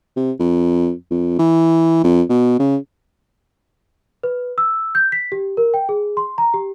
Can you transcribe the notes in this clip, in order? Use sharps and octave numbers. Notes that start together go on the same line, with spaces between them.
C3
F2
F2
E3
F2
B2
C#3
B4
E6
G6
B6
G4
A#4
G5
G#4
C6
A#5
G4